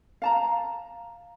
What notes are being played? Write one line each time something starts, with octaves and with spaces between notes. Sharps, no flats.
F5 A5 A#5